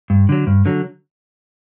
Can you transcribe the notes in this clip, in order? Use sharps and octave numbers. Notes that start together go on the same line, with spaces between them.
G2
D3 F#3
G2
D3 F#3